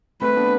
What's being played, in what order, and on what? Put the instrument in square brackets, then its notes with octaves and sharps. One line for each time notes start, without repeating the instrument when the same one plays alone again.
[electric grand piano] A3 C4 [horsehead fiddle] B4
[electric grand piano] B3 D4